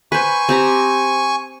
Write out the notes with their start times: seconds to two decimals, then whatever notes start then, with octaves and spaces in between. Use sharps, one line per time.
0.12 B4 C5 G#5 C#6
0.49 C4 G4 A#5